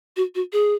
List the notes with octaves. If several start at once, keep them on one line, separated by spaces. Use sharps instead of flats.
F#4
F#4
G#4